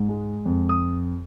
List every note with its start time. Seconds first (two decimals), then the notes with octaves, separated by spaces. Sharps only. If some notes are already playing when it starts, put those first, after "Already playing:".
Already playing: G#2
0.09 G#3
0.46 F2
0.69 D#6